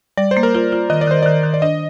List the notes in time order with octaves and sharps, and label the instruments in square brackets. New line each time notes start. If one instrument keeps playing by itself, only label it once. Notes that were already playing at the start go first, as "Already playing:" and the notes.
[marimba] G3 [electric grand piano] D5
[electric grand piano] C5
[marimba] A#3
[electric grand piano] A#4
[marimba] F4 [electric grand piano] C5
[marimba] F4
[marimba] D#3 [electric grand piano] D#5
[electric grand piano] D5
[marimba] D#3 [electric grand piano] C5
[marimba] D#3 [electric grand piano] D5
[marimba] D#3
[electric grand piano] D5
[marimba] D4 [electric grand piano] D#5